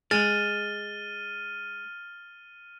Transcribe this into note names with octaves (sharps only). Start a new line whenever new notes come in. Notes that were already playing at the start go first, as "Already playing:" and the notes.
G#3 F6 A6 D#7